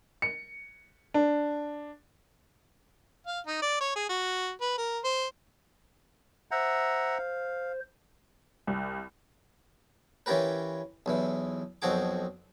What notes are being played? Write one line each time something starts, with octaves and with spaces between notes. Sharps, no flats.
C#7
D4
F5
D#4
D5
C#5
G#4
F#4
B4
A#4
C5
C5 E5 F#5 A#5
F5
C2
E3 C#4 F4 G4 A#4 B4
B1 E2 E3
B1 F2 C4 F#4 G#4 D6